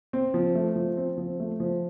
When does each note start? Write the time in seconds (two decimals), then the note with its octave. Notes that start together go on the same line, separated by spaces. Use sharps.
0.13 C4
0.34 F3
0.55 A3
0.76 F3
0.97 C4
1.18 F3
1.40 A3
1.60 F3